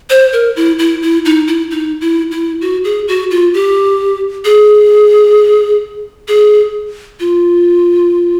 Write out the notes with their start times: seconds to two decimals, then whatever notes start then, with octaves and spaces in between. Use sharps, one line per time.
0.10 C5
0.33 A#4
0.56 E4
0.79 E4
1.02 E4
1.25 D#4
1.47 E4
1.71 D#4
2.01 E4
2.31 E4
2.61 F#4
2.84 G#4
3.08 F#4
3.31 F4
3.54 G4
4.45 G#4
6.28 G#4
7.20 F4